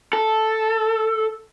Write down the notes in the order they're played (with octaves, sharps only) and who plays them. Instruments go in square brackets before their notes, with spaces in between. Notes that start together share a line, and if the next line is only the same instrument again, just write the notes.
[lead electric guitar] A4